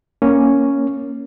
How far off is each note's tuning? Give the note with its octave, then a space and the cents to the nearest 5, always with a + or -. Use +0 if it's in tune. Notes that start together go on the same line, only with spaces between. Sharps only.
A#3 +5 C#4 +0